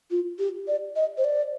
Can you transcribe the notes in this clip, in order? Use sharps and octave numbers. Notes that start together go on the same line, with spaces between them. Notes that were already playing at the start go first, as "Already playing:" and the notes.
F4
G4
D5
D#5
C5
D5